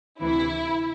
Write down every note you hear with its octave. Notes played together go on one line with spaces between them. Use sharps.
D2 C3 E3 E4